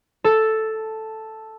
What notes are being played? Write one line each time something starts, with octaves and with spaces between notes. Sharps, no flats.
A4